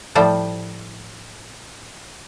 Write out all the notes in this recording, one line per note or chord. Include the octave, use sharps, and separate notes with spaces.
A2 F3 G3 G4 C5